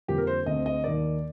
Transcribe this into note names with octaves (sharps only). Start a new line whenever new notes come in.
F2 D3 G3 A#3 G4
A#4
C5
D2 D3 A3 C4 D#5
D#5
D#2 D#3 A#3 D5